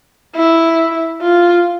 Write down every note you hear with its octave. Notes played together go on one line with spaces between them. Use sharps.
E4
F4